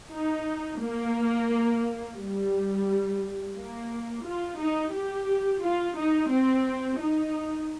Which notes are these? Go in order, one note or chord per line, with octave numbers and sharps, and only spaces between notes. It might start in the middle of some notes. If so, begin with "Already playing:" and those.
D#4
A#3
G3
A#3
F4
D#4
G4
F4
D#4
C4
D#4